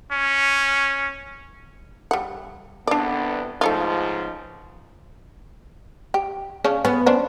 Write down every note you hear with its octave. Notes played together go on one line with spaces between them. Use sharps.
C#4
G3 F#5
C2 D3 B3 D4 D5
C#2 G#2 F3 A3 D#4 F4
G4
C#3 C#4 D4
B3 C#4
C#4 D4 C5